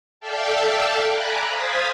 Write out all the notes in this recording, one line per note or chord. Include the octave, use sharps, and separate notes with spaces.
A4 D5 E5 F5 G5 A5
G#5 A#5 B5 D6 F#6
C5 F5 D#6 G#6 A6 B6